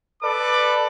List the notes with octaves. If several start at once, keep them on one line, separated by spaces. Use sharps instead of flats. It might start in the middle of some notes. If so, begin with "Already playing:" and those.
A4 B4 D5 D6